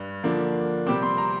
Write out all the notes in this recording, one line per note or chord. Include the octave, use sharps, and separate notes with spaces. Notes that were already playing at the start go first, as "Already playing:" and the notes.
Already playing: G2
D3 F3 A#3 D4
C3 G3 C4 D6
C6
A#5